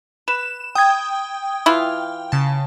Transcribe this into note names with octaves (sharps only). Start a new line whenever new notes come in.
B4 E7
G5 D#6 G#6
E3 E4 F4
C#3 A5